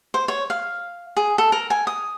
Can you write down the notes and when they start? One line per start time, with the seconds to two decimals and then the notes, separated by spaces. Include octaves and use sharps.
0.14 C5
0.28 C#5
0.50 F5
1.17 G#4
1.38 A4
1.52 A#4
1.70 G#5
1.87 D#6